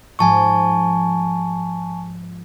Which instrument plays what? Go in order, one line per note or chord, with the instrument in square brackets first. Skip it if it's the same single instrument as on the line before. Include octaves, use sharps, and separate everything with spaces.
[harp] G#2 F3 G#3 [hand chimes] G#5 A5 C#6